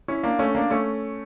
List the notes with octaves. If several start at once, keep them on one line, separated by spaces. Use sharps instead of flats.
C#4 E4
A#3 D4
A3 C#4
A#3 D4
A3 C#4